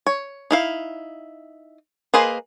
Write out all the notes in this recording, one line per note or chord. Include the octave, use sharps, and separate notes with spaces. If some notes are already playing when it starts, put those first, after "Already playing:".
C#5
D#4 E4 F5
A#3 G#4 B4 C5 D#5